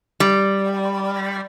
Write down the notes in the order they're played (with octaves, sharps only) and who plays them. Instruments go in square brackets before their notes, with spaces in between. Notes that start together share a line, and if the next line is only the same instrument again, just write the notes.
[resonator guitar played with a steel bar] G3